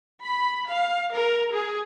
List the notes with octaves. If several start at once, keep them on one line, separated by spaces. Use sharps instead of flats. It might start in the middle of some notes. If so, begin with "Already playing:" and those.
B5
F5
A#4
G#4